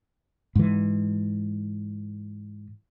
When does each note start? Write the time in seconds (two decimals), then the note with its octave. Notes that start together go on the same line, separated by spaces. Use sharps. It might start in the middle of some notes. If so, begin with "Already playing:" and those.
0.55 G#2 E3